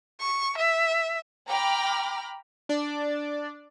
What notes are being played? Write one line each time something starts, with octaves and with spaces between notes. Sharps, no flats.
C#6
E5
G5 A#5 B5 D6 F6
D4 D5